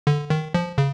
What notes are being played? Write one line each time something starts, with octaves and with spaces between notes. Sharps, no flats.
D3
D#3
F3
C#3